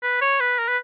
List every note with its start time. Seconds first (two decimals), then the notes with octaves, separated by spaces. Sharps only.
0.03 B4
0.21 C#5
0.40 B4
0.59 A#4
0.68 B4